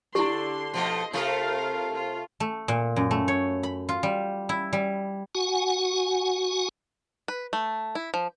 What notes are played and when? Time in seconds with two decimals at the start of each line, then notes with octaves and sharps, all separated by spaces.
0.15 D3 D4 E4 G4 C6
0.74 B2 F3 A3 D#5 C6
1.13 C3 A3 F4 A#4 F5
1.94 F4
2.40 A3
2.68 A#2
2.96 F#2
3.11 A3
3.28 C#5
3.63 B5
3.89 F4
4.03 G3
4.49 E4
4.73 G3
5.35 F#4 F#5 G#5
7.28 B4
7.53 A3
7.95 E4
8.14 F3